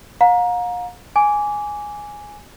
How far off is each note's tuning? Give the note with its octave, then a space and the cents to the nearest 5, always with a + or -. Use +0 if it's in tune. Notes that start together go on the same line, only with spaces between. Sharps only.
F5 +40 A#5 +15
G#5 +0 D6 -20